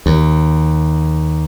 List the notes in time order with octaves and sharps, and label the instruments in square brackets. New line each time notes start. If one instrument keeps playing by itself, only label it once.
[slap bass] D#2